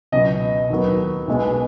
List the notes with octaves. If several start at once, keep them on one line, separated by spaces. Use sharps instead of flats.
C#2 B2 F#3 D#5
D#2 D#3 F#3 B3
B1 B2 G#3 B3